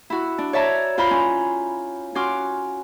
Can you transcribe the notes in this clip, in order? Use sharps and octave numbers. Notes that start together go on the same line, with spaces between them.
E4 F#4
D4
C#5 D5 E5 A5 A#5
F4 C5 A#5 B5
C#4
C#4 F#4 C6 D6 F6